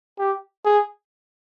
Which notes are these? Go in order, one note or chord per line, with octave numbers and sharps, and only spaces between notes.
G4
G#4